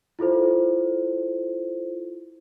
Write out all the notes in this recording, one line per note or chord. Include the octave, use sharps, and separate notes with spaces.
E4 F4 A4 C5